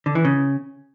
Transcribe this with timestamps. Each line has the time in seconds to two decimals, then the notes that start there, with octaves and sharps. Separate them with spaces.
0.06 D3
0.15 E3
0.25 C#3